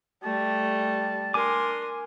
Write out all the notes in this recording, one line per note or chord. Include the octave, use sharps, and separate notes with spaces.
G3 A3 A5
D4 A#4 G#5 C6 D6